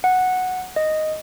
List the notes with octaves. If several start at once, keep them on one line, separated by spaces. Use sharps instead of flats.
F#5
D#5